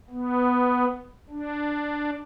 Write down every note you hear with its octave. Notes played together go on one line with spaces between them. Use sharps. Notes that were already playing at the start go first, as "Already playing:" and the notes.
B3
D4